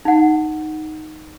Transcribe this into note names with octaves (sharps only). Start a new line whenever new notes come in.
D#4 F#5